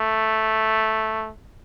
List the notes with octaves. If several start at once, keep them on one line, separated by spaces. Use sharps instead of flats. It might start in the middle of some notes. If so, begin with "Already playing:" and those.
Already playing: A3